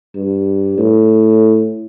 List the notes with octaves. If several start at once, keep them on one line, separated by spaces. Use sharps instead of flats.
G2
A2